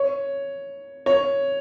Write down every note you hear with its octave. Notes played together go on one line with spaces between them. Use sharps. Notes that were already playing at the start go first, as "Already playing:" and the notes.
Already playing: C#5
C#5